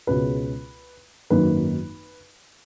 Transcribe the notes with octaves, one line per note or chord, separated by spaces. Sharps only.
C#2 B2 G#3 C#4 B4
G#1 F#2 D#3 A#3 B4